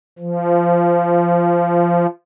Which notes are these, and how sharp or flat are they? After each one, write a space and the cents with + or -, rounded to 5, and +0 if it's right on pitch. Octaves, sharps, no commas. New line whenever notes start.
F3 -20